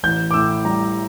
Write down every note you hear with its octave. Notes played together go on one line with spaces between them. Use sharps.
A1 G6
D6
A2 E6
G3 A#5